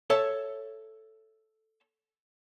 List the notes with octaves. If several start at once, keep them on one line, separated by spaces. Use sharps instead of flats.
A4 C#5 E5 A5